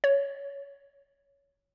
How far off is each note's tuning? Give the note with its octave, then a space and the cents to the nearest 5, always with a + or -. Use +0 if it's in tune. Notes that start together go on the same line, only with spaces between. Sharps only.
C#5 +15